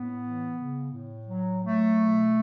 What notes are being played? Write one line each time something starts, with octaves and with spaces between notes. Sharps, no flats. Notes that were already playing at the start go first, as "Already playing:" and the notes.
Already playing: A2 B3
E3
C#3
A2
F#3
F#3 A3
B2